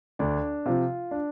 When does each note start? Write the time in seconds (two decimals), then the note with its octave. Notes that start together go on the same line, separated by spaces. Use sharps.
0.19 D2 D4
0.65 C3 F3 F4
1.11 D4